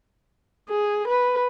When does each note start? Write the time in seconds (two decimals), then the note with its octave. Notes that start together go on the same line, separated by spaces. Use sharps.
0.69 G#4
1.08 B4